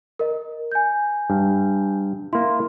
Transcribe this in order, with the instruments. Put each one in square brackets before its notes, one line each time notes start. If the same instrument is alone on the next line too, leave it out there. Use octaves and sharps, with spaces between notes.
[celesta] A#4 D#5
G#5 G6
[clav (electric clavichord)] G2
[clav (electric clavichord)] A#3 E4 [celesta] C6